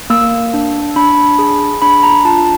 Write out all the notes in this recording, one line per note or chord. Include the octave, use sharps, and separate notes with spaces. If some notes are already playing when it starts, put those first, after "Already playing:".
A#3 E6
D4
D4 B5
G#4
D4 B5
A#5
F4 A5